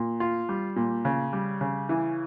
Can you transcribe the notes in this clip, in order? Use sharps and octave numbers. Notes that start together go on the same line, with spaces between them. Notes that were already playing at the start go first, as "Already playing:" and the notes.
Already playing: A#2
F4
G3
A#2
C#3
G3
C#3
E3